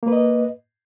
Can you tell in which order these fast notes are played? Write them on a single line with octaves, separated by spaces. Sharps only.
A#3 B4 D#5